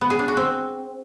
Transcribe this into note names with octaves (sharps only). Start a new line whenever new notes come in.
B3
G#4
D4
F#4
C4